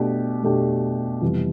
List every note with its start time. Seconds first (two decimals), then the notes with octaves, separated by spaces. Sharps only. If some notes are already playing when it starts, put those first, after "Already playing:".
Already playing: B2 A3 D4 G4
0.43 B2 A3 D4 G4
1.22 F2 C3 E3 G3 B3